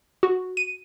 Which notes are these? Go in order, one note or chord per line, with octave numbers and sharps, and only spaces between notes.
F#4
D#7